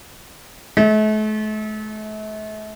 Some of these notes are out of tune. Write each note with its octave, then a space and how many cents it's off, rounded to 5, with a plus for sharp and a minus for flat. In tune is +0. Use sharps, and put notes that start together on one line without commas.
A3 -40